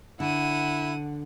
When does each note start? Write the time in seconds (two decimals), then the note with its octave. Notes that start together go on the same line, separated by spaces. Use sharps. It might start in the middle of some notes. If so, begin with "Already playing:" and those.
0.20 D3 E4 F#5 D#7